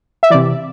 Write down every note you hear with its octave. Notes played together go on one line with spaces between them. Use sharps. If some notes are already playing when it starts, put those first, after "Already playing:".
E5
C3 E3 D5